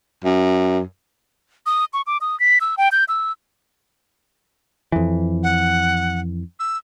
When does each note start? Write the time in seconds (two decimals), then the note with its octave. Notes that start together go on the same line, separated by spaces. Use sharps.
0.24 F#2
1.66 D#6
1.93 C#6
2.07 D6
2.21 D#6
2.40 B6
2.61 E6
2.78 G5
2.92 G6
3.08 E6
4.92 F2 E3
5.43 F#5
6.60 E6